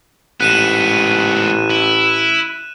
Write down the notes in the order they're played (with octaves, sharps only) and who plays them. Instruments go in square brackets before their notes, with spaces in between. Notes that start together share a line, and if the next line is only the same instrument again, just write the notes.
[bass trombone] A1 [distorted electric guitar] G#2 B3 [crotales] F#6 D#7 E7
[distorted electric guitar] E4